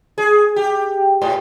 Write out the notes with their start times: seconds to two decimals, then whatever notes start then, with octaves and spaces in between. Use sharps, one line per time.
0.18 G#4
0.56 G4
1.22 G#2